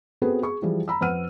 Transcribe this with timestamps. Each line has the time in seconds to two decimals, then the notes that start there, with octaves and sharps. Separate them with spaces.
0.22 B3 C4 F#4 G#4 A4 B4
0.42 G#4 C#6
0.62 E3 F3 G3 F4 G#4
0.88 A#5 B5 E6
1.01 F2 B4 F#5 F6 D#7